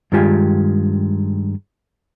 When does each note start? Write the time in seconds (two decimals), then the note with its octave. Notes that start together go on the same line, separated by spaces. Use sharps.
0.12 G2 D#3 G#3 F4 G4 G#5